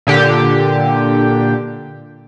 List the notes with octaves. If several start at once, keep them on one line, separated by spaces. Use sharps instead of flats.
A#2 D3 G4